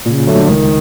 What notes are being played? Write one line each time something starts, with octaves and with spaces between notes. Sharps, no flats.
A#2 C#3
D3 F#3 A3
C#2 D#3